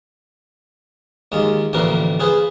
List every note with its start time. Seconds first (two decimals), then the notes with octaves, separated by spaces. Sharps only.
1.32 D#2 G#3 F4
1.73 A1 D2 A#2 F3 A#4 B4
2.20 F4 G#4 B4 C5